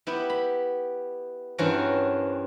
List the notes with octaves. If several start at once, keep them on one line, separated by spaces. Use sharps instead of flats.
B3 E4 G4
B5
G2 E3 C4 C#4 F#4 A#4